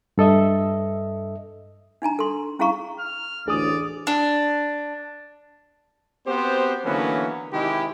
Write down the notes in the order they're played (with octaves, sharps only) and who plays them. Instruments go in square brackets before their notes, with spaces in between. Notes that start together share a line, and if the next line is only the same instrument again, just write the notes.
[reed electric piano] G2 A4 D#5 E5
[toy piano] D4 D#4 G#5 A#5
A4 C6
C#4 E4 G#4 F5 A#5 C#6
[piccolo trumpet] F6
[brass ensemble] A1 D2 [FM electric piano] G#4 D#6 [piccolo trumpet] D5
[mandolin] D4
[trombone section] B3 C4 F#4 G4 C5
D3 E3 F#3 A#3 B3 C#4
C3 D#3 G#3 D#4 E4 G4